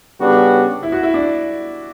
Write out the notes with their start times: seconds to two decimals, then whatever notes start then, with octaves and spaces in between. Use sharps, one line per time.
0.18 C#3 G3 B3 D4 F#4
0.83 E4
0.92 F#4
1.03 E4
1.14 D4